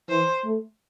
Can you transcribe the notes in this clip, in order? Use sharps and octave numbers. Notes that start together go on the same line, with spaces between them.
E3 C5
A3